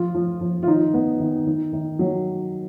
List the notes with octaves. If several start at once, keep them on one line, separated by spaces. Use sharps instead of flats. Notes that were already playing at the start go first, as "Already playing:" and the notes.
Already playing: F3 F4
F3
F3
F4
D#3 D#4
B3
D#3
D#3
D#3
F#3